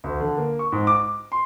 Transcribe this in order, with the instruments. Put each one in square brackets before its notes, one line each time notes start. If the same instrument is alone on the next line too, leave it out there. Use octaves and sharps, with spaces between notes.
[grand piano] D2
D3
A#3
C#6
G#2
D6
C6